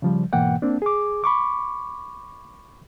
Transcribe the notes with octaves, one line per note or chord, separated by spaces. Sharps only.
C#3 F3 G3
G#2 B2 E3 A#3 F#5 G5
A#3 C4 D4
G#4 D6
B5 C#6 D6